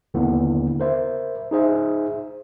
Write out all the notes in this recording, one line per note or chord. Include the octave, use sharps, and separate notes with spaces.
D#2 D3 A#3 B3 E4
A#4 C5 E5
D#4 G#4 C5 E5